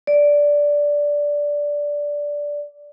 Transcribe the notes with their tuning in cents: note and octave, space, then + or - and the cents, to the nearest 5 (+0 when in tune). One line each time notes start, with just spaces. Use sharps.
D5 -10